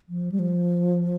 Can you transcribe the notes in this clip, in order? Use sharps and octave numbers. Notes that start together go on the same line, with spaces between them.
F3
G3
F3